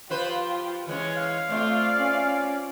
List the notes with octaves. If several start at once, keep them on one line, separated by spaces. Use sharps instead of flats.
F3 F4 G4 B4 C5
E3 G#3 C#4 C#5
F5
A3 C4 F4 D5
C#4